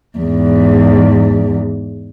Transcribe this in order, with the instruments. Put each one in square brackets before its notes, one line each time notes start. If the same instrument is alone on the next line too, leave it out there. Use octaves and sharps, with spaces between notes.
[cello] E2 G#2